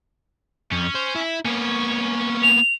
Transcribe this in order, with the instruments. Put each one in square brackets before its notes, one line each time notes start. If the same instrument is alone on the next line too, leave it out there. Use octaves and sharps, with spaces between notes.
[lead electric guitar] F2 [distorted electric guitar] C#4
[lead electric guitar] C5
E4
[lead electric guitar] A#3 B3 [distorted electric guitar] C#4 C#5
[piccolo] F7